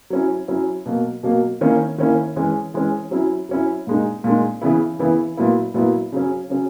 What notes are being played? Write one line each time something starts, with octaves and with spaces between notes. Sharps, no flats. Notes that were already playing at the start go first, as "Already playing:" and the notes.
F#3 C#4 E4
F#3 C#4 E4
B2 F#3 A#3
B2 F#3 A#3
D#3 A#3 C#4 E4
D#3 A#3 C#4 E4
E3 G#3 C#4
E3 G#3 C#4
F#3 C#4 E4
F#3 C#4 E4
A#2 G#3 D#4
A#2 G#3 D#4
C#3 E3 B3 E4
C#3 E3 B3 E4
A#2 F#3 B3 E4
A#2 F#3 B3 E4
C#3 F#3 C#4
C#3 F#3 C#4